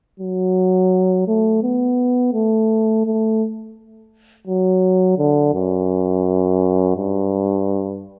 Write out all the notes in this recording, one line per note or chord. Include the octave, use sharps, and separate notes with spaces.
F#3
A3
B3
A3
A3
F#3
D3
F#2
G2